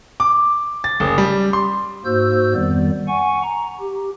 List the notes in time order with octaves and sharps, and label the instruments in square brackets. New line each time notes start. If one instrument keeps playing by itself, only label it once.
[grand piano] D6
A6
F#1
G3
C6
[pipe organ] G#2 A#3 F#4 C5 E6 G6
F2 D#3 G3 B3 D5
F#5 G#5 C#6
A#5
G4